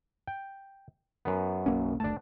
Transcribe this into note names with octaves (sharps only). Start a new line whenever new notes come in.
G5
F#2 B3
B1 A#3 C#4
F#1 D2 A3 D4 A5